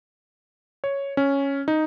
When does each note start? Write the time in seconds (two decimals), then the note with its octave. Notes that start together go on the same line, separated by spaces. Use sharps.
0.84 C#5
1.17 C#4
1.68 D#4